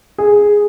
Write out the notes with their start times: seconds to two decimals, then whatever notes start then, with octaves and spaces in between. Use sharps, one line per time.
0.18 G#4